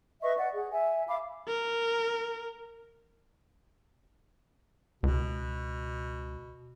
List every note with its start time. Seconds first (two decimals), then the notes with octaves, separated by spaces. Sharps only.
0.22 B4 D#5 E5 C#6
0.37 D5 F#5
0.52 G#4
0.72 E5 G#5
1.08 E5 F5 B5 D6
1.48 A#4
5.03 C#2 B2